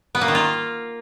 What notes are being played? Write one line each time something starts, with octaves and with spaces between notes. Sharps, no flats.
B3
A#3
D#3
F4